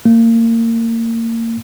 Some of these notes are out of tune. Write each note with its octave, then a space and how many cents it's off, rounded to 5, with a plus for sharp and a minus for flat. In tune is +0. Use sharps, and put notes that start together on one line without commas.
A#3 -30